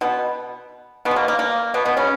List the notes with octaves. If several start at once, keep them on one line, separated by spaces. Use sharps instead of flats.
B2 B3
B2 B3
G#3
A#3
A#3
A#3
B2 B3
B2 B3
C#3 C#4